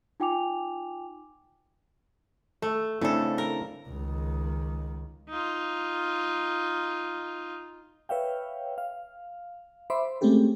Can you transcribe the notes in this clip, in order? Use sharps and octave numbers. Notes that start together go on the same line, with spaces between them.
D#4 F4 G5 G#5 D6 F7
A3 A4
C#3 A3 C4 D4 E4 A4
A#4
C#2 D#3
D#4 F4
B4 C#5 E5 F5 G5
F5
C5 E5 B5 C6 D6
G#3 A3 C4 C#4 G4 A4